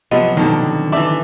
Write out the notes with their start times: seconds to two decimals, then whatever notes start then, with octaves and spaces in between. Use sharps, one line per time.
0.11 C3 F3 F#3 B3 D#5
0.37 B2 D3 D#3
0.92 E3 D4 E5 D6